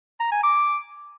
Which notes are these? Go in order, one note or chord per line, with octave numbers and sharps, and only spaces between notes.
A#5
G#5
D6